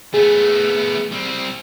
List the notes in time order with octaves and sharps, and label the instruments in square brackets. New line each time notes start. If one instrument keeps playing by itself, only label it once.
[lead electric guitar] A3 B3 [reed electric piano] G#4
[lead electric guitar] G3 C4